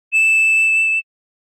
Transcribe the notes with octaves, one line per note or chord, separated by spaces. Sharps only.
E7